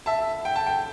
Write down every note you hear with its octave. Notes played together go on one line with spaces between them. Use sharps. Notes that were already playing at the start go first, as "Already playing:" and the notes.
E5 A5
G5
A5
G5